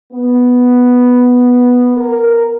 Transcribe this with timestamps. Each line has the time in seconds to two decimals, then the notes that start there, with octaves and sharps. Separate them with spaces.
0.13 B3
1.97 A#4